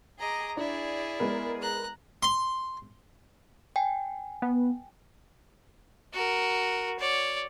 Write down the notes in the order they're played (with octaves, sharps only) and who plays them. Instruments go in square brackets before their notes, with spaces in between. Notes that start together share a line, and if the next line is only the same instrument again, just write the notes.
[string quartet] G#4 D6 [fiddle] D#5 A#5
[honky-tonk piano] D4 [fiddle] E4 [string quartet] G#4 D5
[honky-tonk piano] G#3 B3 A#4
[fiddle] A#5 F#6
[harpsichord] C6
[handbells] G5 G#5
[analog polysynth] B3
[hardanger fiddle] F#4 A#4
C#5 D5